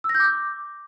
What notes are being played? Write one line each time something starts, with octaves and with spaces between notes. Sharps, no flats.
E6
A#6
G6
D6